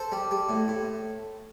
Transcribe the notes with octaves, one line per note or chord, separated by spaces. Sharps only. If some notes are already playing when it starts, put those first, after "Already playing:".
Already playing: A4 C5
G3
G3
A2
A2